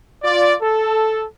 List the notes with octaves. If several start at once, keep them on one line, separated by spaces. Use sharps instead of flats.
F4 D5
A4